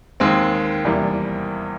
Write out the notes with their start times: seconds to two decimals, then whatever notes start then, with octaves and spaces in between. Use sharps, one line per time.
0.20 D#2 D#3 G#3 C4
0.85 E2 C3 E3 G3 A#3